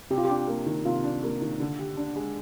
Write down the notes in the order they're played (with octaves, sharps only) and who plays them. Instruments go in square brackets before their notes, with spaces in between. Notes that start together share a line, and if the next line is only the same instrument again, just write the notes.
[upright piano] C3 [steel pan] G4
[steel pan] F4
[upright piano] D4 [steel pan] G4
[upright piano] A#3
D#3
[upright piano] C3 [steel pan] F4
[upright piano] D4
A#3
D#3
D3
G4
D4
G#3